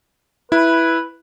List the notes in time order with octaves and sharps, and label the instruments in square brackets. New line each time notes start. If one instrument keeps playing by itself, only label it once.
[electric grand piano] E4 [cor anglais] B4